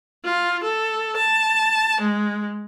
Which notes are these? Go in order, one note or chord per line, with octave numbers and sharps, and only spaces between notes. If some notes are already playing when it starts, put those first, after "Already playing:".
F4
A4
A5
G#3